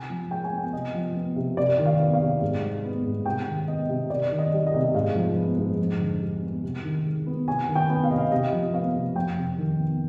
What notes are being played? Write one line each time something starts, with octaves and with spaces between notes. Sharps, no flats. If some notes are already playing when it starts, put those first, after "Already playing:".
Already playing: C3 G#5
F3
G#3 G5
G#5
B3
G5
C3 D#5
F3
B3
C3
C3 D5
D#3
F5
B3
F5
C3
G#2
G3
B3
G#2
C3 G5
D#3
B3 D#5
C3
C3 D5
D#3
D#5
G3
D#5
C3
G#2 F5
F3
B3
G#2
F2
D3
G3
B3
C3
D#3
G#3
B3
C3 G#5
D#3
G5
B3
F5
C3 D#5
F5
C3 D#5
F3
B3 F5
C3
F2 G5
C3
D#3
B3